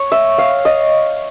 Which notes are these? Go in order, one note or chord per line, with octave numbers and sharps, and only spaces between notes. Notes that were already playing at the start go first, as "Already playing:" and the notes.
Already playing: C#5
E5
F5
D#5